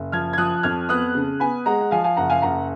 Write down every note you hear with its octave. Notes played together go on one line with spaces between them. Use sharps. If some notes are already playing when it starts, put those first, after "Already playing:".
Already playing: F#1
F3 F6 G#6
G#6
F3 D#6 F#6
F2 F6 G#6
B3 D#6 F#6
C#3
B3 G#5 B5
G#3 F#5 A#5
F#5
F3 F5 G#5
F5 G#5
F#1 F#5 A#5
F5 G#5
F#1 F#5 A#5